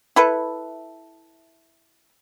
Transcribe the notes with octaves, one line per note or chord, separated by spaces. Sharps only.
E4 A4 B4